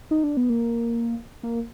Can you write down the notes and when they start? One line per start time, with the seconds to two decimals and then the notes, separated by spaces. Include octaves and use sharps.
0.11 D#4
0.24 D4
0.37 B3
0.50 A#3
1.43 A#3